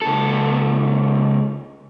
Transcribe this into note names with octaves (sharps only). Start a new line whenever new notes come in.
C#2 A4